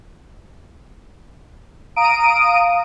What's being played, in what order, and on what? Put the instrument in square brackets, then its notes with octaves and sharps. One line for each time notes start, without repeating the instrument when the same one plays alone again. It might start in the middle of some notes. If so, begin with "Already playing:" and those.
[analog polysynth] F5 A#5 D#6 D7 D#7